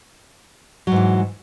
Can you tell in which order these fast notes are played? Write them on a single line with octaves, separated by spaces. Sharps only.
F#3 G#2 E3